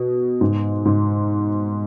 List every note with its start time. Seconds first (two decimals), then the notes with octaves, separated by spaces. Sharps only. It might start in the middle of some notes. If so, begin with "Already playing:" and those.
Already playing: B2
0.41 G#2
0.85 G#2